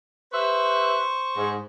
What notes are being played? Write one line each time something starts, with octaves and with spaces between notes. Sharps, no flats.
G4 B4 C5 E5 C#6
G#2